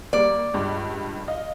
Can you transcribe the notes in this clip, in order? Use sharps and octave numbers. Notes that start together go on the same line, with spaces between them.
G3 A#3 D5
C#2 G2
D#5 F5